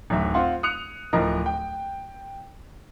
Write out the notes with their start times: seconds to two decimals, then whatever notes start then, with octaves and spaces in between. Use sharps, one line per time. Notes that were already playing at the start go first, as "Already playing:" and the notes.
0.10 D1 F#2 D#3 F#3 E5
0.34 C4 F4 F#5 C6
0.63 D#6 F#6 C#7 F7
1.13 D1 F3 E4 A#4 D#5
1.46 G5